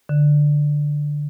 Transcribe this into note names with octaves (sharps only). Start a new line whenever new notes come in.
D3